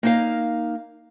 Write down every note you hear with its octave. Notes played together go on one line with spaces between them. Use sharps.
A#3 D#4 F5